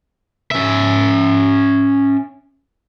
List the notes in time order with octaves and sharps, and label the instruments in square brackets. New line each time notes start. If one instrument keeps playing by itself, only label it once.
[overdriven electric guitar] C#4 E5